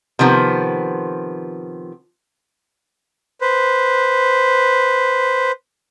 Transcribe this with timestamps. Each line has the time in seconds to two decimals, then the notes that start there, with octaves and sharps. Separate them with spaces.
0.19 C3 D#3 F3 B3
3.41 B4 C5